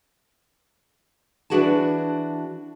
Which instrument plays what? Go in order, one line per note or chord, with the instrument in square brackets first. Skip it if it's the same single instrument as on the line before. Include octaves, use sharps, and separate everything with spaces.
[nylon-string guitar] E3 D4 F#4 G#4 A5